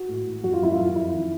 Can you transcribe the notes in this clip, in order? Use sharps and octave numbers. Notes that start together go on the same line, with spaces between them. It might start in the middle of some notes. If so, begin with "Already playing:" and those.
Already playing: F#4
A2
A2
F#2 F#4
F4
F#2 E4
F4
F#2
F2 E4
D#3